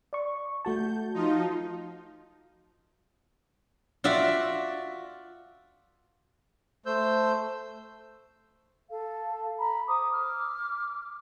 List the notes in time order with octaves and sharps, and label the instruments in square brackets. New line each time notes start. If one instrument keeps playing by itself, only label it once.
[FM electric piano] D5 C#6
[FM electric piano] A3 F#4 A5 [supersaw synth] G6
[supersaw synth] F3 D#4 F4
[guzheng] F4 F#4 D5 E5
[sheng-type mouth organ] A3 C5 E6 G6
[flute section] A4 F5
A#5 B5
C5 A#5 D6 D#6
D6 F6